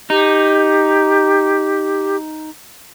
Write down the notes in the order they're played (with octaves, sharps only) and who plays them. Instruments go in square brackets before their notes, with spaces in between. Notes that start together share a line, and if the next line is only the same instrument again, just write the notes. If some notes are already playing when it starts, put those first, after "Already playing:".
[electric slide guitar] D#4 [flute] G4